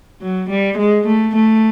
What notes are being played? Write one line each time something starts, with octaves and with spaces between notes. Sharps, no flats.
F#3
G3
G#3
A3
A3